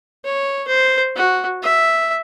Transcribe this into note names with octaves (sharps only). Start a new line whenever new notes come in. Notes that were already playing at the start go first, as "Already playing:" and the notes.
C#5
C5
F#4
E5